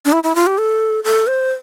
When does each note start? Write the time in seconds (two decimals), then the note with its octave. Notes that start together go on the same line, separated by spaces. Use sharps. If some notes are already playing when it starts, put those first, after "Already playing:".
0.05 D4
0.12 E4
0.24 E4
0.35 F4
0.47 G4
0.58 A4
1.04 A4
1.27 C5